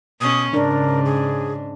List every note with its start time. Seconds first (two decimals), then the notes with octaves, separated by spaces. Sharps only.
0.21 B2 C#4 D#6
0.53 G#2 C#3 D4 A#4
1.05 G#4